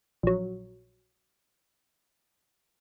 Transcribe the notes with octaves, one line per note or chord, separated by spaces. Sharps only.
A#1 F#3